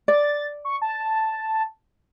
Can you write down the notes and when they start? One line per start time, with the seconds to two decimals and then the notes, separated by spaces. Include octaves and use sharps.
0.08 D5 A6
0.65 C#6
0.82 A5